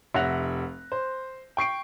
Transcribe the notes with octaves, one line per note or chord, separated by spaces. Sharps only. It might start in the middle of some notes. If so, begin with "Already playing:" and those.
F1 E5 F#5 F#6 A#6 F7
C5
G5 C#6 C7 D7